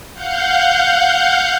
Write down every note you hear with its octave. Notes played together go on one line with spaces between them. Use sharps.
F5 F#5 G6